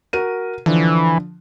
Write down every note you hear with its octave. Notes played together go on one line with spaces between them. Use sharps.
F#4 A#4 D#7
D3 E3 F3